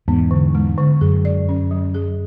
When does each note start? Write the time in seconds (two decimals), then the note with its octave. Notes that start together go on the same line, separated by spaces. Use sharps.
0.08 E2 G#2 B3
0.31 D3
0.55 G#3
0.78 D3
1.01 F#2 G#4
1.25 D5
1.49 C#4
1.71 F#3
1.95 G#4